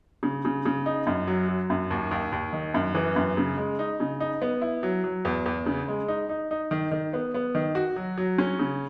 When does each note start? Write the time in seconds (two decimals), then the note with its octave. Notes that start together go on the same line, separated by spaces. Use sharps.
0.23 C#3
0.45 C#3
0.66 C#3
0.86 D#4
1.07 F#2
1.28 F#3
1.49 F#3
1.70 F#2
1.91 D#2
2.11 D#2
2.32 D#2
2.53 D#3
2.74 F#2
2.95 E3
3.16 F#2
3.37 C#3
3.57 G#3
3.79 D#4
4.00 C#3
4.20 D#4
4.42 B3
4.62 E4
4.83 F#3
5.04 F#3
5.25 E2
5.46 E2
5.66 C#3
5.88 G#3
6.08 D#4
6.29 D#4
6.51 D#4
6.71 D#3
6.91 D#3
7.13 B3
7.34 B3
7.55 D#3
7.75 F#4
7.96 F#3
8.18 F#3
8.38 C#4
8.59 C#3